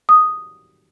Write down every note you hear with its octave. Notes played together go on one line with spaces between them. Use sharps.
D#6